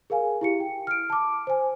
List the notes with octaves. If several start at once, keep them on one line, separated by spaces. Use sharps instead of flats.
G#4 A#4 F5 G#5
E4 G4 C#7
G5
F6 D7
A5 D6
C5 G#5